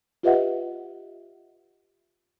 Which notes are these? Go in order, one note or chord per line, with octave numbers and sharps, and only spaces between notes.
F4 G4 B4 D#5 E5 F#5